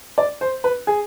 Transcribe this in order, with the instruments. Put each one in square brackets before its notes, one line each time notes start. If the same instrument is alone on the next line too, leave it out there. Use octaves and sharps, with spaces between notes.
[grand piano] D5
C5
B4
G#4